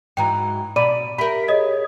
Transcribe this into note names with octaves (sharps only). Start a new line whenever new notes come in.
G#2 E3 F#3 G5 A#5
B2 D5 B5 D#7
G4 A#4 E5 B5
G#4 C#5 D#5